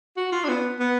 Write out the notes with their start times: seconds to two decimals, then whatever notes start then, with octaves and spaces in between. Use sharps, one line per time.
0.17 F#4
0.32 F4
0.44 D4
0.49 B3
0.79 B3